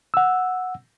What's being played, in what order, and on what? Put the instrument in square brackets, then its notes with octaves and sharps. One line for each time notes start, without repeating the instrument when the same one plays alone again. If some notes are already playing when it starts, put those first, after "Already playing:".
[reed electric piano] F#5 E6